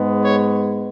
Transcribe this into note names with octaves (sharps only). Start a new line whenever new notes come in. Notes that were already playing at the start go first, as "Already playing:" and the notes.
Already playing: G#2 G#3 B3
C#5